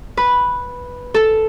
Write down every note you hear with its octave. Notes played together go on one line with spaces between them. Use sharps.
B4
A4